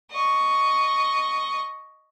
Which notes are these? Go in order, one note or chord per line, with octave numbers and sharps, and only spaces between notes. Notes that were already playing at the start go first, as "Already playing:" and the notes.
D#5 C#6